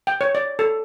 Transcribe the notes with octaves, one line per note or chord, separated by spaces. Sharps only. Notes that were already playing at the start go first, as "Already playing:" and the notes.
G5
C#5
D5
A4